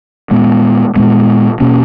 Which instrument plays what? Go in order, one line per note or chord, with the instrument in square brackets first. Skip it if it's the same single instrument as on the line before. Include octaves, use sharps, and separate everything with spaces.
[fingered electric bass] A#2 G#3 B3
A#2 G#3 B3
B2 A#3 C#4